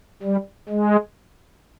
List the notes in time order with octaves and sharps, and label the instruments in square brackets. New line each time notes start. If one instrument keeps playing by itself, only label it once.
[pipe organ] G3
G#3